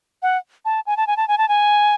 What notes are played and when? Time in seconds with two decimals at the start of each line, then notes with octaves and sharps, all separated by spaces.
0.22 F#5
0.65 A5
0.87 G#5
0.97 A5
1.07 G#5
1.17 A5
1.28 G#5
1.38 A5
1.48 G#5